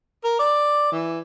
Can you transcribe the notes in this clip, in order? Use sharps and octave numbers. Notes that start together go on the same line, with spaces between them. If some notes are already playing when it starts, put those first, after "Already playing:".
A#4
D5
E3